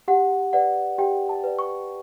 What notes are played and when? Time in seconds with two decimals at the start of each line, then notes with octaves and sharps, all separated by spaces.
0.08 G4 F#5
0.53 B4 D5 F#5
0.98 G4 G5
1.29 A5
1.44 B4 D5
1.59 C#6